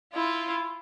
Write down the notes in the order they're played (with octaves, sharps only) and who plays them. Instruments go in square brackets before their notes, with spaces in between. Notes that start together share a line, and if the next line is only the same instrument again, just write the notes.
[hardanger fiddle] E4 [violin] F4